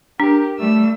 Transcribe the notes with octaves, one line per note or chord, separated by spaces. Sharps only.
D4 G4 A#4
G3 A3 E6